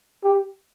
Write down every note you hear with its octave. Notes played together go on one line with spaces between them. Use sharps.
G4